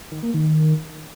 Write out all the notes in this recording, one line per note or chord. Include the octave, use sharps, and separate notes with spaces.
D#3
A#3
D#3